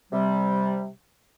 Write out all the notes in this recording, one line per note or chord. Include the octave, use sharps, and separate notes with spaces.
C3 G3